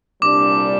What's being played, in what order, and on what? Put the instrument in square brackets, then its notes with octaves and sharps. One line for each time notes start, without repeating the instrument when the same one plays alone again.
[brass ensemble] C2 A#2 G3 D4 [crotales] D6